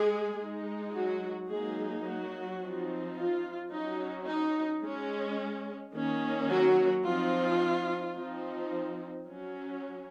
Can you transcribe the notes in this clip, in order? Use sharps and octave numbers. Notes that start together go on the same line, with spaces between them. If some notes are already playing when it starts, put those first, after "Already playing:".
Already playing: G#3 G#4
G#3 D#4
F#3 F#4
F#3 G#3 A#3 D#4 G#4
F#3 F#4
F3 C4 D#4
F4
F#3 C#4 D#4
D#4
G#3 C#4
D#3 A#3 C#4
F#3 F#4
F3 C4 D#4 F4
F3 C4 D#4
F#3 C#4